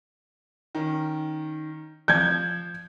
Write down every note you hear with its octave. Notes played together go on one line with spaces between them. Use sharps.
D#3 C#4
F3 G6 G#6